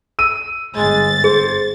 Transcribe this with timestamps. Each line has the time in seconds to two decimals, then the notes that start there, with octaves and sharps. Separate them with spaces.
0.19 E6 D#7
0.76 G1 G#3 A6
1.24 G#4 C5